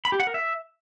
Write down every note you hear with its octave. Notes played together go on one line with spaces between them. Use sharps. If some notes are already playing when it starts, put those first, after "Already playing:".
B5
G4
F#5
A#4
E5